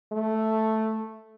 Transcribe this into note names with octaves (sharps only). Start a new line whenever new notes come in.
A3